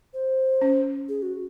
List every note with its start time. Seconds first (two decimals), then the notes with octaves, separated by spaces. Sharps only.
0.14 C5
0.62 C#4
1.09 G#4
1.22 F#4